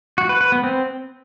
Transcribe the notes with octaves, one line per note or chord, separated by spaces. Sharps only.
F#4
B4
B4
B3
C4